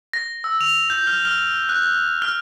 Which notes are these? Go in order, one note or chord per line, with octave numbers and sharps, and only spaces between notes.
A#6
E6
F7
G6
F6
F6
F#6
F6